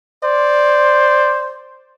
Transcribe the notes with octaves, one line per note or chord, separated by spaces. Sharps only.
C5 D5